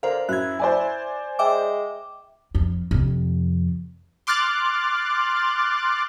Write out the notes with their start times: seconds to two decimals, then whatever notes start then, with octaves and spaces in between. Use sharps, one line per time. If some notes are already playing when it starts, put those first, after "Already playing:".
0.03 D3 A#4 C5 F5
0.29 F#2 E4 F#6 G#6
0.59 C5 D5 G#5
1.39 G#3 E5 G5 D6
2.55 F2
2.91 F2 C3
4.27 C6 D6 F6 F#6 A6